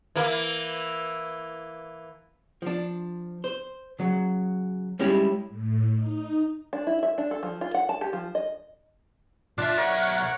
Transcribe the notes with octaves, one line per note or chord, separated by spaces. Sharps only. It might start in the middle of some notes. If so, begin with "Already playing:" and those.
E3 A#3
F3 D4
C5
C#3 F#3
G3 G#3 C#4 E4 G4
A2
D#4
D4
E4
E5
D4
A4
F3
F4
F#5
A5
G4
F3
D#5
B1 D4 F4 D5 E5 A5
A#4 C#5 F#5